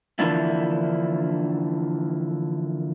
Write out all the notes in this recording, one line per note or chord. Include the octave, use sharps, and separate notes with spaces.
D3 E3 F3 A#3 D4 E4